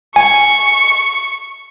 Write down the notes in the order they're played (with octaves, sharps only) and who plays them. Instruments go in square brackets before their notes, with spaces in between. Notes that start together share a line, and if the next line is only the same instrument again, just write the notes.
[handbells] G#5 [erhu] C#6